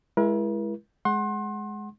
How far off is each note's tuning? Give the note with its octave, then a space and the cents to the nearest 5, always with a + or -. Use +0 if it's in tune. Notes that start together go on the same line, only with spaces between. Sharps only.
G#3 +0 E4 +25 A#4 +45
G#3 +10 F#5 +5 C6 +30